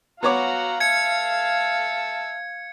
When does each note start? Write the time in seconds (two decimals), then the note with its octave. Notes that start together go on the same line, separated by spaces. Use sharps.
0.23 B3 F#4 C#5 F5 F#5 A#5 D6
0.80 E5 A5 G#6 C#7